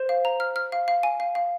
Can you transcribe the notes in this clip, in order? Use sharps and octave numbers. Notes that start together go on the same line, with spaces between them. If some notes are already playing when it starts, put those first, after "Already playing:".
Already playing: C5
F5
A#5
F6
F6
F5
F5
G#5
F5
F5